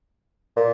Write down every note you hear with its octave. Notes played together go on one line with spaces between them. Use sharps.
A#2